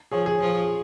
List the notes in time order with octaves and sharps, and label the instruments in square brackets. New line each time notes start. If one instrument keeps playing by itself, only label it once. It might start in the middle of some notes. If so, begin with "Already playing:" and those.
[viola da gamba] F3 [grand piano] G#4 C#5
[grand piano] G#4
[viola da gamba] F3